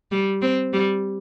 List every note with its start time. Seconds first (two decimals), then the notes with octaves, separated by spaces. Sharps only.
0.11 G3
0.42 C4
0.73 G3